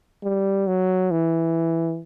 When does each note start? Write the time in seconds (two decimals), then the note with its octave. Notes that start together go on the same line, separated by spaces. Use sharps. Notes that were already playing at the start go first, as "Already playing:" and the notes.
0.23 G3
0.67 F#3
1.11 E3